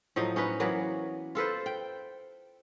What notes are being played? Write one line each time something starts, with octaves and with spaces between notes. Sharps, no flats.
A2 F3 F#3 D#4
C#4 D#4 B4
E3 F#3 A#3 B3
F4 A4 B4 C5
G5